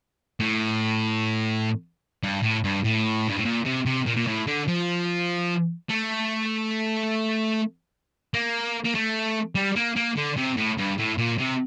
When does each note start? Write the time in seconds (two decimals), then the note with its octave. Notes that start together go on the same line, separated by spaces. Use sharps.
0.40 A2
2.23 G2
2.43 A2
2.64 G2
2.84 A2
3.28 G2
3.37 A2
3.45 A#2
3.65 C3
3.86 C3
4.06 A#2
4.16 A#2
4.27 A2
4.47 D3
4.68 F3
5.89 A3
8.34 A#3
8.84 A#3
8.95 A3
9.55 G3
9.76 A#3
9.96 A#3
10.17 D3
10.37 C3
10.57 A2
10.78 G2
10.98 A2
11.18 A#2
11.39 C3